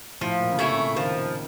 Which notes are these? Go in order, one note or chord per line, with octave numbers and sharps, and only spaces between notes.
A2 F3
A#2
C#3
C3 A3 C#4 E4
C#3
D#3 F3